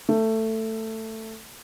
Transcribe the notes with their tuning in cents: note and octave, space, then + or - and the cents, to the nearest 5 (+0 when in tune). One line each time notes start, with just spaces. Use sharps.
A3 +15